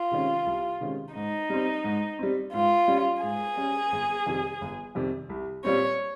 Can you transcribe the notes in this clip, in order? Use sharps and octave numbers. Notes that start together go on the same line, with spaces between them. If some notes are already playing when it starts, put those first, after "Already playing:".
Already playing: F4
C3 D#3 G#3 C#4
C2
C3 D#3 G#3 C#4
G#2 D#4
G3 C4
G#2
G3 C4
G#2 F4
G3 C#4
G#2 G#4
G3 C#4
G1
F2 C3 D#3 G3
G1
F2 C3 D#3 G3
C2
A#2 G3 C4 C#5